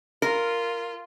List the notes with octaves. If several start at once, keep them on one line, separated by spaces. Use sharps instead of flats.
F4 A#4